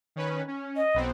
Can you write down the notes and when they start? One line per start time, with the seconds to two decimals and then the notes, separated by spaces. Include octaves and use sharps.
0.16 D#3 C#4 B4
0.47 C#4
0.76 D#5
0.94 B1 B3 C4